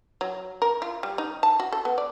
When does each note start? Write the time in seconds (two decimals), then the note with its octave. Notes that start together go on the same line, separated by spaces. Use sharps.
0.21 F#3
0.62 A#4
0.82 F4
1.03 G3
1.18 D#4
1.43 A5
1.60 F#4
1.72 A4
1.85 B3
1.98 D5